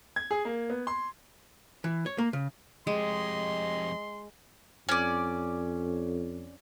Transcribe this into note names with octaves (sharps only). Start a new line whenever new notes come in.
G#6
G#4
A#3
B3
C6
E3
C#5
A#3
C#3
F2 G#3 G4 D#5 C6
F2 C#4 D5